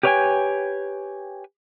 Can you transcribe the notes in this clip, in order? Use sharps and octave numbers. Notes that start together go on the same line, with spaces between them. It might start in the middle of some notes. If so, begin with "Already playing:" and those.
G4 B4 C#5 E5 G5 G#5